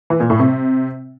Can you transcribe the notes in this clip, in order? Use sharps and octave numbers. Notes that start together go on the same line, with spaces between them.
E3
A#2
A2
C3